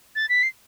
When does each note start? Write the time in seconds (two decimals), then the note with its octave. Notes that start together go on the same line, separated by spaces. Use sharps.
0.16 A6
0.29 B6
0.43 C7